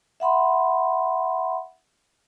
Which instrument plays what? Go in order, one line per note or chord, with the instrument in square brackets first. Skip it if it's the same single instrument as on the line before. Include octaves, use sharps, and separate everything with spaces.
[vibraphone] E5 F#5 B5 C6